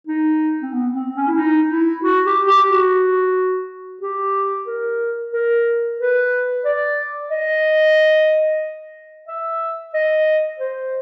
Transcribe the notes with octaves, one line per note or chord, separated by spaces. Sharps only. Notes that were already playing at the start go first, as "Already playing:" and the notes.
D#4
C4
B3
C4
C#4
E4
D#4
E4
F#4
G4
G4
F#4
G4
A#4
A#4
B4
D5
D#5
E5
D#5
C5